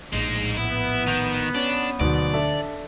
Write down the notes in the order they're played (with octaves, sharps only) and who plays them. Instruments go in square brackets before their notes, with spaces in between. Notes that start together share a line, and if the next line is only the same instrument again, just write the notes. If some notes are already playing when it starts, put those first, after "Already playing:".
[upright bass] A#1 A2 [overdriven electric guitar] G#3 D#4
[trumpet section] B3 [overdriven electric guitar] E4
[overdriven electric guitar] D#3 [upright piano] G6 F7
[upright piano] C#4 [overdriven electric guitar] D4
[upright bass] D2 [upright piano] G#2 B2 F#3 [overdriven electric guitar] D5
[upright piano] D4 A4 E5